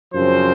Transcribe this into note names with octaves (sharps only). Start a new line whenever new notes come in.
F#2 C#3 F3 C4 C5